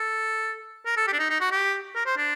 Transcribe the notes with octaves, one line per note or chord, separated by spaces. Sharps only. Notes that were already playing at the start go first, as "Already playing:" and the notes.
Already playing: A4
A#4
A4
G4
D4
D#4
D#4
F#4
G4
A#4
C5
D4